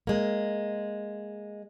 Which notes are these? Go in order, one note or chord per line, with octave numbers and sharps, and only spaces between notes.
G#3 A#3